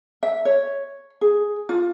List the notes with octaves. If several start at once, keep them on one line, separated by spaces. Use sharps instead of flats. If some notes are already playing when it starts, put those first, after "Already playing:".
E5
C#5
G#4
F4